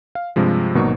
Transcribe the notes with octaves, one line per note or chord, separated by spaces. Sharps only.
F5
G2 C3 F3 G#3
G#1 B2 F#3 A#3 D#4 C#6